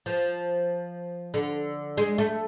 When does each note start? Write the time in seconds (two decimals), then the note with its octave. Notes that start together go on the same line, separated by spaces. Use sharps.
0.06 F3
1.34 D3
1.97 G#3
2.18 A3